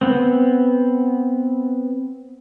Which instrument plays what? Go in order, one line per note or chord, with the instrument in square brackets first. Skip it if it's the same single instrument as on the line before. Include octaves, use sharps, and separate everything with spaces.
[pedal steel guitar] B3 C4